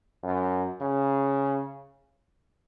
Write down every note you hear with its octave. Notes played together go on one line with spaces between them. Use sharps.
F#2
C#3